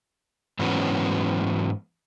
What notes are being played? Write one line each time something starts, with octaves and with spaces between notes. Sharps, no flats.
G#2 E3 F#3 B3 C#4